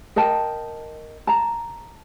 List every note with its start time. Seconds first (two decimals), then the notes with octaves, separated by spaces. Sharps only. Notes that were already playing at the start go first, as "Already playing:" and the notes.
0.16 A#4 D#5 G5 A5
1.27 A5 A#5